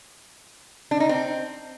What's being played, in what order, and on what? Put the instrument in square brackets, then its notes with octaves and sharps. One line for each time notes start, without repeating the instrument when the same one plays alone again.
[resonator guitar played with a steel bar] D4
D#4
C4